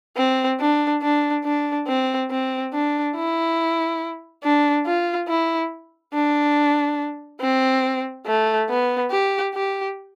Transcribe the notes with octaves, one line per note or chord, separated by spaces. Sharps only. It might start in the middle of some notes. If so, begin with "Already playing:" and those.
C4
D4
D4
D4
C4
C4
D4
E4
D4
F4
E4
D4
C4
A3
B3
G4
G4